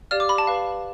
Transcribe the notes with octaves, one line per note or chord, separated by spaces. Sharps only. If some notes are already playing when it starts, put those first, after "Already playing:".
G4 D5 F5 F6
D6
B5
A5
B4 F5